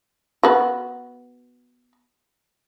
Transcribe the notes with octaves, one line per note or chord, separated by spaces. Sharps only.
B3 F#4